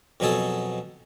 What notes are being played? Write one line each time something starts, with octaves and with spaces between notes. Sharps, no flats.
F2 B2 F#3 G#4 A4